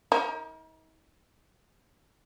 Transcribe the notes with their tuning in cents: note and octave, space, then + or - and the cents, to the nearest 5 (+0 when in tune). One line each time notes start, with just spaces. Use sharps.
D#4 +45 A#4 +0